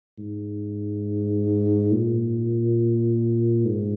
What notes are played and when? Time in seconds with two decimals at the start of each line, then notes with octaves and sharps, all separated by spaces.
0.18 G#2
1.92 A#2
3.65 G#2